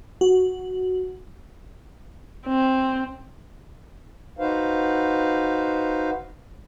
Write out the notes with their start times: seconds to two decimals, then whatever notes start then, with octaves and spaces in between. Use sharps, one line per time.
0.21 F#4
2.47 C4
4.39 D#4 F#4 B4 C5 F5